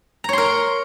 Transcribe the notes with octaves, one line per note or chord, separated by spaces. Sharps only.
A#4 C#5 A#5 C6